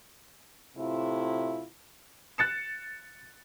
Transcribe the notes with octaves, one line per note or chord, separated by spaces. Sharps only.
A2 C3 A3 E4 F4
F#6 A6 C#7 E7